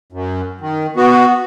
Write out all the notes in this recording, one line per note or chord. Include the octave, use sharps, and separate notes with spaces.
F#2
D#3
B3 F#4